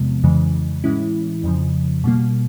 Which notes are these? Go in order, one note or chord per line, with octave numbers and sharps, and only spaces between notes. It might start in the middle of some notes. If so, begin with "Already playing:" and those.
Already playing: E2 C3 F3 G#3 B3
F2 C#3 E3 G#3
A2 E3 G#3 C#4 E4
F2 C#3 F3
B2 G3 A#3